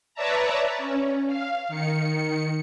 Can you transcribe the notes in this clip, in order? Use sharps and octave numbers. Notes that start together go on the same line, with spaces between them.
B4 C#5 D5 E5 A5 A#5
C#4
F5
D#3 C#7